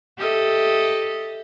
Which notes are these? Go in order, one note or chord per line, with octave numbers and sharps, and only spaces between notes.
G4 A4 D#5 E5